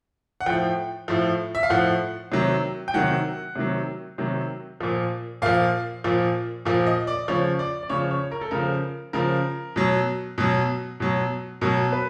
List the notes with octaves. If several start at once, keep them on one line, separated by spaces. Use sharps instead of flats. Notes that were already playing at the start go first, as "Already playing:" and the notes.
F#5
A2 F3 G5
A2 F3
E5
F5
A2 F3 F#5
C3 D#3 F#3
G5
C3 D#3 F#3 F#5
C3 D#3 F#3
C3 D#3 F#3
A#2 F3
A#2 F3 F5
A#2 F3
A#2 F3
D#5
D5
C#3 F3 C#5
D5
D5
C#3 F3 C#5
C#5
A#4
A4
C#3 F3 A#4
C#3 F3 A#4
B2 F#3
B2 F#3
B2 F#3
B2 F#3 A#4
B4